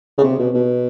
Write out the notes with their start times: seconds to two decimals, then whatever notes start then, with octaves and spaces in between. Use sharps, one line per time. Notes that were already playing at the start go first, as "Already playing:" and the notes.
0.18 C#3
0.24 C3
0.39 B2
0.54 B2